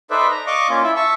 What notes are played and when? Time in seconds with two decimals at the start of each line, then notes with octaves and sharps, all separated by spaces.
0.11 D#4 A4 B4 C5 D5 E5
0.31 A#5
0.47 D5 D#5 F5 C#6 D6
0.69 A#3 C#4 F4
0.83 E4 E5
0.96 E5 A5 C#6